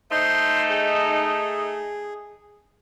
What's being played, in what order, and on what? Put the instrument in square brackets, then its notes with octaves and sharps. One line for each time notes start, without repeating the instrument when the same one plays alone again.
[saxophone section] A3 D#4 [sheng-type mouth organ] C5 C6
[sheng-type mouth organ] G#4